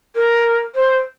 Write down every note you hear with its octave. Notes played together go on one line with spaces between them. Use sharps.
A#4
C5